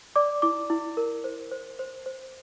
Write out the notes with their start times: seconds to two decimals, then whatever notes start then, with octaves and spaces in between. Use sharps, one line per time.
0.16 D5 D6
0.42 E4 D6
0.70 E4
0.97 A#4
1.24 C5
1.51 C5
1.79 C5
2.06 C5